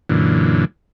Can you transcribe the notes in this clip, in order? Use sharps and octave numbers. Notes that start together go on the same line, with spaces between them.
F#2 A#2 D3 E3